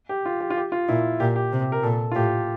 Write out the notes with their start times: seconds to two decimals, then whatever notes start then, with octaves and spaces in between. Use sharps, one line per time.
0.09 G4
0.26 F4
0.40 G4
0.50 F4
0.57 G4
0.72 F4
0.88 A#2 E4
1.20 A#2 G4
1.36 G4
1.52 C3
1.72 A#4
1.83 A#2 A4
2.12 F4
2.15 A2 G4